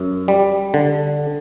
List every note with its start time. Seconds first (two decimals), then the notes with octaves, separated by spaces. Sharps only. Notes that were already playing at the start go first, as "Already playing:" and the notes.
Already playing: F#2
0.28 G3
0.74 D3